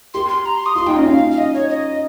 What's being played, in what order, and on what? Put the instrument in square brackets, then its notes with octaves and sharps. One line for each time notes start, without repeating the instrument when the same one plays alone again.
[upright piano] G4 [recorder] C6
[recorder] C6
A#5
C6
D#6
[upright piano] F4 [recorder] C6
[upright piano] D#4 [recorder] G5
[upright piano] C#4 [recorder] D#5
[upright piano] C#4 [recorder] F5
[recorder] F5
D#5
C#5
D#5